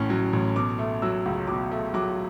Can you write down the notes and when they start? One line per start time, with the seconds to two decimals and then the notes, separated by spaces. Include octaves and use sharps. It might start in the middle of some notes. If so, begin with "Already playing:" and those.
Already playing: A1 A2 C#4
0.10 F#3
0.33 A1
0.56 B2 D6
0.79 A3
1.02 F#3 E6
1.26 C#2
1.47 B2 D6
1.72 A3
1.94 F#3 D6